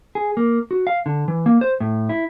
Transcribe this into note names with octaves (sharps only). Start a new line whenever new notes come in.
G#4
A#3
F#4
F5
D3
E3
A#3
C5
A2
E4